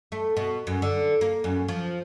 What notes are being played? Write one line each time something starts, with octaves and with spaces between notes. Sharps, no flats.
A3
B2
F#2
D3
A#3
F#2
F3